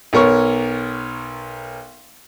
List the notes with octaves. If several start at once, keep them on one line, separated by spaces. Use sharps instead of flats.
B1 B3 A#4 C#5 C#6